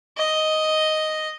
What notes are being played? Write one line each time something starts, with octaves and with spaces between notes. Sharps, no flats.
D#5